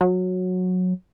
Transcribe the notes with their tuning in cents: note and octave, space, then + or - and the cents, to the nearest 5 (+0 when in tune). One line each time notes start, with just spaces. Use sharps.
F#3 -15